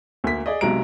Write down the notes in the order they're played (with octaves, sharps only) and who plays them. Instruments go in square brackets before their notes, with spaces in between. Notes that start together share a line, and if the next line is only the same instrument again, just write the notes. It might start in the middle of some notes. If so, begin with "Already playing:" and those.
[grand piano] D2 A#3 B6
G#4 D5 D#5
B1 C3 F#3 G#3 A#5 D7